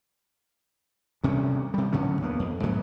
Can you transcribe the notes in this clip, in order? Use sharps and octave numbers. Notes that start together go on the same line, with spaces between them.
D2 C3 G3 C#4
C3 G3
A2 D3 F#3 C#4
D#2 A#3 B3
F2
G#2 F#3 B3